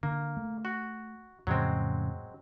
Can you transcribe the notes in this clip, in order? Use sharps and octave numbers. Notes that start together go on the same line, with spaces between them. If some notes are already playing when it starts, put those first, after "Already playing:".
D3 A#3
A3
F#4
F2 A2 C#3 F#3 G#3 C4